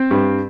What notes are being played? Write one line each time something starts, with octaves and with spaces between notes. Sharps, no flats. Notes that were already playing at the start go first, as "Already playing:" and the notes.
Already playing: C4
G2